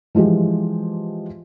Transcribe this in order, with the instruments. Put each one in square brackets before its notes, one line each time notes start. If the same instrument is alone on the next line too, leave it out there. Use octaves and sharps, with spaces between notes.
[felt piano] E3 F3 G#3 F4 G4